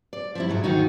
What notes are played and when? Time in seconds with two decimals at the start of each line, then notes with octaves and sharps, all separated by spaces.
0.13 D5
0.35 F3 G3 E4
0.48 G#2 B2 F#3
0.64 D2 D#3 D#4 F#4